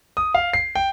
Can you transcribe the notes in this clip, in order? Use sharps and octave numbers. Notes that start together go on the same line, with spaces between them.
D#6
F5
C7
G5